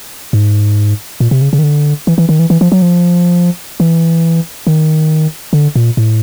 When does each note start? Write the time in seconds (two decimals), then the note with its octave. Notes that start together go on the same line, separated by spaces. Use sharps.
0.33 G#2
1.20 A#2
1.31 C3
1.42 C#3
1.53 C#3
1.59 D#3
1.63 D3
2.07 E3
2.18 E3
2.29 D#3
2.39 E3
2.50 E3
2.61 F3
2.72 F#3
2.82 F3
3.80 E3
4.67 D#3
5.53 D3
5.76 A#2
5.97 A2